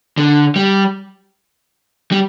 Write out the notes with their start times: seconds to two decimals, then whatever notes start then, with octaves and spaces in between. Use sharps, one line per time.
0.18 D3
0.56 G3
2.12 G3